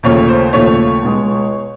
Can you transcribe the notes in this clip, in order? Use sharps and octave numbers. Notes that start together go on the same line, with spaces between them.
D#2 C#3 F3 A3 C#5
C5
D#2 C#3 F3 A3 C#5
C#2 B2 G#3